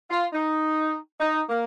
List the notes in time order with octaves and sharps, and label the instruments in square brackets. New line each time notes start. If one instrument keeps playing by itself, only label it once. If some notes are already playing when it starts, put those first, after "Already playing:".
[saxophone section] F4
D#4
D#4
A#3